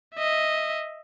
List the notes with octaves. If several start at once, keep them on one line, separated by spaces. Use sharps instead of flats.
D#5 E5